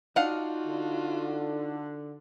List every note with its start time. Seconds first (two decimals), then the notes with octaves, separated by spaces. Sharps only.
0.16 D4 D#4 F4 F#4 F5 F#5
0.65 D3